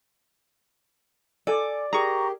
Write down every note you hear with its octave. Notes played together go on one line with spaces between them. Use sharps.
A4 D5 G#5
G4 G#4 A#4 A#5 C#6